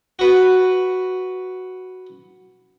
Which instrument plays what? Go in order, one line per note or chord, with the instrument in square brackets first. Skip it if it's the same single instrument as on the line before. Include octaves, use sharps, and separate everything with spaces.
[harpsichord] F#4 B4